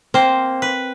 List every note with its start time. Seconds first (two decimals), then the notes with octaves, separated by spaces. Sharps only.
0.14 A#3 C4 C5
0.62 B4